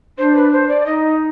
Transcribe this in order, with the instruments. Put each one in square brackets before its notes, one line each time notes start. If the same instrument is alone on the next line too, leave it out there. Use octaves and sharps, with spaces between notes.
[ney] D4 [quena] C5
[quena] B4
C5
D5
[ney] D#4 [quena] D#5